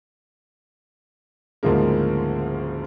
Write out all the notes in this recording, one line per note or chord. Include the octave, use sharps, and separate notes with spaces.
D2 G#2 C#3 F3 G#3 A#3